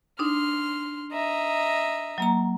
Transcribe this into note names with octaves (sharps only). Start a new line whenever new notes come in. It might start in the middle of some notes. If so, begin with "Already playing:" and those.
D4 D#4 C6 F6
D#5 E5 A#5
F#3 A#3 A#5